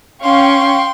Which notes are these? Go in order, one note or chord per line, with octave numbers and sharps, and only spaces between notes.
C#4 F5 G5 C6 C#6